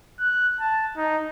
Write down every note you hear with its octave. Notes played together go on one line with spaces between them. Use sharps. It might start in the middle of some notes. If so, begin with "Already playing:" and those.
F#6
A5
D#4